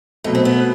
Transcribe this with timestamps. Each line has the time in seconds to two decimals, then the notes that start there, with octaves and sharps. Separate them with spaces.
0.24 B2 F#3 A3 D#4
0.35 C4
0.45 B3